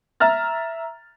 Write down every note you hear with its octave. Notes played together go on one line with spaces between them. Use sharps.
E5 A#5 F6 A6